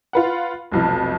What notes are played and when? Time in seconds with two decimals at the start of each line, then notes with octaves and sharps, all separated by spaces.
0.13 F4 B4 F#5
0.71 F1 B1 F2